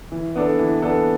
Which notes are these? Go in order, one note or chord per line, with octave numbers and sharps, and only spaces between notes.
E3
B3 D4 A4
E3
B3 D4 A4